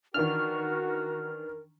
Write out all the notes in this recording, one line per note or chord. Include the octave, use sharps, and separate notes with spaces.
D#3 E3 D4 F#4 A#4 F6